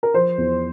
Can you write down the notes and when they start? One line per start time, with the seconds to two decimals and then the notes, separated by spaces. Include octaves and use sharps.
0.03 A#4
0.14 F3 C5
0.38 E2